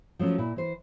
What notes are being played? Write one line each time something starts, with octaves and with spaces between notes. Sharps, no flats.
F3 F#3 A3 C#4
A#2 E4
E3 C5